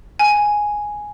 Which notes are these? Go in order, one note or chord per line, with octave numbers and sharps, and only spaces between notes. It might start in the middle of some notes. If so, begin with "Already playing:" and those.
G#5